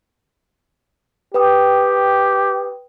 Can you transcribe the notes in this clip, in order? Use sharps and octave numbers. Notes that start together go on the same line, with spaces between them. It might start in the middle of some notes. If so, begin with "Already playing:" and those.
G4 B4 G5 D#6